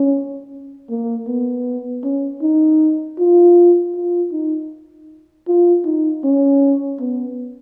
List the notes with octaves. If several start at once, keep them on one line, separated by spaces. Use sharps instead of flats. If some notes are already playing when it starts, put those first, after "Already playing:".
Already playing: C#4
A#3
B3
C#4
D#4
F4
F4
D#4
F4
D#4
C#4
B3